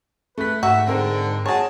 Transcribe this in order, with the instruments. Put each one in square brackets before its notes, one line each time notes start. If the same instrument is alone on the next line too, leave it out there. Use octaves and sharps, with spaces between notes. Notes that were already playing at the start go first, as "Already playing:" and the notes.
[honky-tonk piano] A3 B6 [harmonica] B4
[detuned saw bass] G#2 [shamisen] F#4 [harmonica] E5
[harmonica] D3 [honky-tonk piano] G#3 C4 A#4
[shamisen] F#4 C#5 [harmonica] G#4 A5